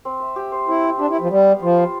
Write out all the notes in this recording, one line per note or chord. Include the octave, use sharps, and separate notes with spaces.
C4
E5
G4
C5
C4 E4
C4
D4 G4
E4
B4
F3
G3 B3
F5
F3 F4
C5